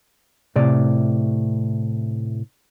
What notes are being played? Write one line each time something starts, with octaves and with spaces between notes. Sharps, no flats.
A2 C3 D5